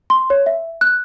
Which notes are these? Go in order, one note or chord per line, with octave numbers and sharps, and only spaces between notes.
C6
C#5
E5
F#6